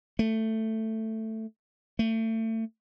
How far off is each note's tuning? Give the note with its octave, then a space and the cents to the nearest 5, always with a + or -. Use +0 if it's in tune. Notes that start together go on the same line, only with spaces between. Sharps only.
A3 +10
A3 +30